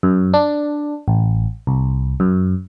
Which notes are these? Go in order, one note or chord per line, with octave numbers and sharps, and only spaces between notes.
F#2
D4
A1
C2
F#2